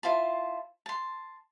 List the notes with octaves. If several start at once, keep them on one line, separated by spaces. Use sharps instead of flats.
E4 F4 C5 A5
A5 C6